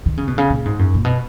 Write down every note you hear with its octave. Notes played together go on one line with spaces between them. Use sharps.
D#3
C#3
B2
C#3
A#2
G#2
F#2
A#2
B2